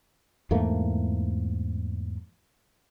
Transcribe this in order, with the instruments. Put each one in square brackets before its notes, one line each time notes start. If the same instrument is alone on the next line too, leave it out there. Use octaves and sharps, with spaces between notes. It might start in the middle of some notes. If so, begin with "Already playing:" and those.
[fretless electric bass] E2 G#2 A3 A#3